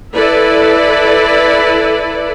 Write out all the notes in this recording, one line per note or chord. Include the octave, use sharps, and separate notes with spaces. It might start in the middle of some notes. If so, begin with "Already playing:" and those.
E4 A4 B4 D5